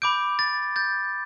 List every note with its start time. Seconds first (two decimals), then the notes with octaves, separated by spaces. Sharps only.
0.02 B5 D6 G6 D7
0.39 A6
0.76 G6 A6